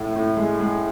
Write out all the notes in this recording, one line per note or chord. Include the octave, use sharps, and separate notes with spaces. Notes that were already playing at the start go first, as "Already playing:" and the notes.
Already playing: A2
A2
G#3
G#3